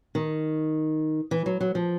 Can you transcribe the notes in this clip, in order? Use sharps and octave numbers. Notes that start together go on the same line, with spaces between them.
D#3
E3
F#3
F#3
F3